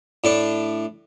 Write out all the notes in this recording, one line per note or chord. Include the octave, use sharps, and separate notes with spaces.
A2 D4